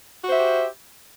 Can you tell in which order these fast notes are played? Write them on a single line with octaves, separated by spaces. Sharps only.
F#4 C5 E5 G4